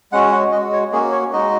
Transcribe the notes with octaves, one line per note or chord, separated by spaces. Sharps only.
G#3 C#4 F#4 F#5
F#5
G#3 F#4 D#5
C#5
A#3 C#4 F#4 G#4
C#5
G#3 D#4 F#4 D#5